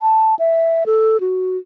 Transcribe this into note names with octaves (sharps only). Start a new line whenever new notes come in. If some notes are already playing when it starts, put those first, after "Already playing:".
A5
E5
A4
F#4